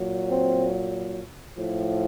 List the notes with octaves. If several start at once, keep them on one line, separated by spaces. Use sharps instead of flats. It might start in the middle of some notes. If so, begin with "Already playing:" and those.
Already playing: A#2 F#3
C4
A2 F3